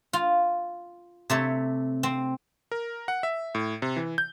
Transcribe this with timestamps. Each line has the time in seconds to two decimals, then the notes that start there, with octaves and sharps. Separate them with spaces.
0.13 F4
1.30 C3 A3 C#5
2.03 C4
2.72 A#4
3.08 F#5
3.23 E5
3.55 A2
3.82 C3
3.96 E3
4.18 G6